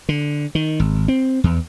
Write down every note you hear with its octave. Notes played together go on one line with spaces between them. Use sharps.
D3
D#3
G#1
C4
E2